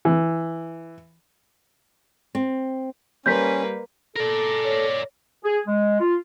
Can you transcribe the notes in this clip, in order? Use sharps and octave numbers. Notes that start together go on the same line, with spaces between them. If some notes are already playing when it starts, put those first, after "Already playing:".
E3
C4
G3 A#3 C#4 B4 C5 G6 B6
A4 A#4 D5
C#5
G#4
G#3
F4